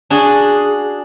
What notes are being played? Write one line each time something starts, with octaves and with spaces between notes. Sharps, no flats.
D4 F#4 G#4